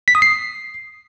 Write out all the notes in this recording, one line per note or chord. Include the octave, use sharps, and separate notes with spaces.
B6
D#6
C7